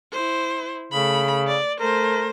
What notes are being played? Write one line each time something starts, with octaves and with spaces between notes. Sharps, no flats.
E4 C5
C#3 A3 B5
D5
A3 A#4 C5